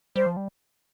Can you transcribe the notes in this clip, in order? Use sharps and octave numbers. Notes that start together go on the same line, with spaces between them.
G3 C5
F3
G3